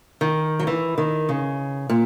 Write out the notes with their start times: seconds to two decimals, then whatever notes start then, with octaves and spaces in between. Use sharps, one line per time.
0.21 D#3
0.60 F#3
0.67 E3
0.98 D#3
1.29 C#3
1.90 A#2